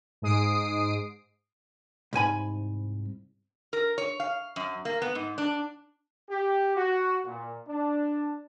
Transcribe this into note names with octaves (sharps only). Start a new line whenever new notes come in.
G#2 G#3 D#6 C7 D7
C2 G#2 G#5 B5
A#4
C#5
F5
F#2
A#3
B3
G#2
D4
G4
F#4
A#2
D4